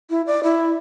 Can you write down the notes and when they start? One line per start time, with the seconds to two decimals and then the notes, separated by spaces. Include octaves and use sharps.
0.10 E4
0.27 D5
0.44 E4